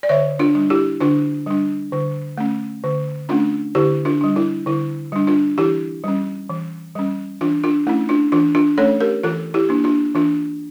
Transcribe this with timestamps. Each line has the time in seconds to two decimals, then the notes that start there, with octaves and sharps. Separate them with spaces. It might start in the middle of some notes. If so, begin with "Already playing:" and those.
0.03 D5
0.09 D3 C#5 E5
0.39 D4 F4
0.55 G3 D4
0.70 E4 G4
1.00 D3 D4 F4
1.46 G3 D4
1.92 D3
2.38 A3 C#4
2.84 D3
3.29 A3 C#4 D4 F4
3.75 D3 E4 G4
4.05 D4 F4
4.21 G3 D4
4.36 E4
4.66 D3 E4
5.12 G3 D4
5.27 D4 F4
5.58 E3 E4 G4
6.04 G3 C#4
6.50 E3
6.95 G3 C#4
7.41 E3 D4 F4
7.64 D4 F4
7.87 A3 C#4 E4
8.09 D4 F4
8.32 E3 D4 F4
8.55 D4 F4
8.78 A3 C#4 A4 C#5
9.01 G4 A#4
9.23 E3 F4 A4
9.54 E4 G4
9.69 A#3 D4
9.84 D4 F4
10.15 E3 D4 F4